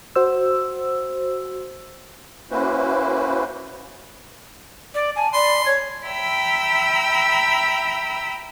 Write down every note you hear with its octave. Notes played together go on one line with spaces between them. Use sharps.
F#4 C5 E6
A#3 C#4 E4 F#4 B4 C5
D5
G#5 A5
D5 B5 C6
C#5 G#6
E5 G5 A#5 B5 E6